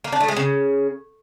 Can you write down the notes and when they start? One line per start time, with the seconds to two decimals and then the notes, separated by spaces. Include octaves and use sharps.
0.04 A#3
0.12 D4
0.20 A3
0.28 G#3
0.36 C#3